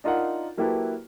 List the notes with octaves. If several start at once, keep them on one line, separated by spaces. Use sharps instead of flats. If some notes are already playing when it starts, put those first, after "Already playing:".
D4 D#4 F4 A#4 F#5
F#3 A#3 E4 G4 A4 B4